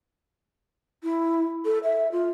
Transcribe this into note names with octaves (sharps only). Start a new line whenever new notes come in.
E4
A4
E5
F4